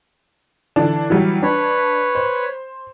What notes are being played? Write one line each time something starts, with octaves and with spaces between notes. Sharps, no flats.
D3 E3 D4
E3 F#3 G3
D4 B4 C#5
C5